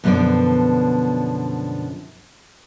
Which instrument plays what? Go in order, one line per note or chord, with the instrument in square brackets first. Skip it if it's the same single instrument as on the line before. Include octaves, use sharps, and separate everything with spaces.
[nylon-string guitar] F#2 B2 D3 F3 B3 D5